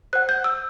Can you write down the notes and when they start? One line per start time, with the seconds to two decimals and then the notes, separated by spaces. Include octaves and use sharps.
0.13 C5 F#5 F#6
0.29 G6
0.44 E6